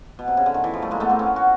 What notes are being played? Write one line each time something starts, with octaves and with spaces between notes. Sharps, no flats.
B2
C3
C#3
D3
D#3
E3
F3
G3 A3
G#3 A#3
A3 B3
A#3 C4
B3 C#4
F#4